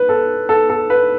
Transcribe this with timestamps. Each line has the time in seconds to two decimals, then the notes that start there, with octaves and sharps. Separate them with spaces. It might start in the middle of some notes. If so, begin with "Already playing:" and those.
Already playing: B4
0.09 A4
0.49 A4
0.69 A4
0.90 B4